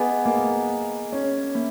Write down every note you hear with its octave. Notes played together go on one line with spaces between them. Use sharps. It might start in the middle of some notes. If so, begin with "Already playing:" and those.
Already playing: B3 G#4 D#5 G#5
A#3
C#4
A#3